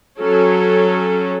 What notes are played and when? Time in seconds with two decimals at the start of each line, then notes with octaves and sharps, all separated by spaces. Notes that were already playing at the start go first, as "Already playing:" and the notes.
0.18 F#3 C#4 A4